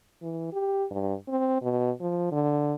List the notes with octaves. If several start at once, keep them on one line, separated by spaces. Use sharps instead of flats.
E3
G4
G2
C4
B2
F3
D3